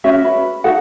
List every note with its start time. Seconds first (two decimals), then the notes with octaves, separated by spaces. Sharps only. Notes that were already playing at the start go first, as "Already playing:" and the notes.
0.04 C#4 F#4 E5
0.24 B4
0.64 D#4 F#4 A4 F#5